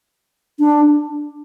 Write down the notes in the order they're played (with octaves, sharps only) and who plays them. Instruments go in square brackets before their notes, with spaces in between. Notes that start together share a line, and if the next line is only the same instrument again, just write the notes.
[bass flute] D4